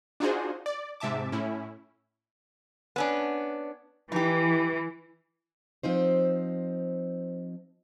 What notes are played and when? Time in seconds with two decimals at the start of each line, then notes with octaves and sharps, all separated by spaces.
0.20 D4 D#4 F4 F#4 G#4 C5
0.66 D5
1.00 G#2 C3 E5 A5 D6
1.32 A2 C#4 E4
2.96 B3 C#4 D4
4.12 E3 D#4 G4
5.83 F3 C4 D#4 C5